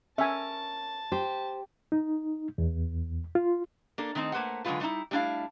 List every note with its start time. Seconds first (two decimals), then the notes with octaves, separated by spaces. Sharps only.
0.18 C#4 A#4 E5 G#5 A5
1.12 G4 C5
1.92 D#4
2.58 E2
3.35 F4
3.98 A#3 D4 A4
4.15 D#3 A3 C4 D#4
4.32 A3 A#3 B4 C5 F#5
4.65 D3 F#3 G#3 A3 F4 B4
4.80 G3 A3 C4 D#4 E4
5.11 G3 A3 D4 E4 F5